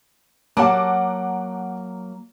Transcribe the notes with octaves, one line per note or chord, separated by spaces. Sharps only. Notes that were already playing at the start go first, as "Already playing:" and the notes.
F#3 A#3 F#5 A5 D6